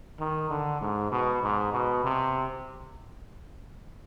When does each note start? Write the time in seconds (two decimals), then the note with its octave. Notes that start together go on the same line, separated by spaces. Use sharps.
0.19 D#3
0.50 D3
0.81 G#2
1.12 B2
1.42 G#2
1.73 B2
2.04 C3